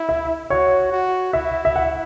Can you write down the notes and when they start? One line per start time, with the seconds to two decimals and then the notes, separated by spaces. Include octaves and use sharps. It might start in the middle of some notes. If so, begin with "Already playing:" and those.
Already playing: E4
0.09 E5
0.50 F#4 C#5
0.92 F#4
1.33 E4 E5
1.65 E5
1.76 F#5